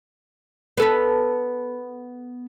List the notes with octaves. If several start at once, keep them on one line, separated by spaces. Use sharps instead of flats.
B3 A4 B4